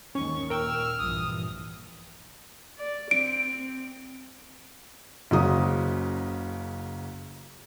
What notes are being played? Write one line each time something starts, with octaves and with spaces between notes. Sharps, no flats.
D#2 G#2 D#3 C#4 C#6
A#2 A#4 G5 E6 F6
A#1 G2 E3 D#6
D5
C4 D7
F#1 C#3 F#3 D#6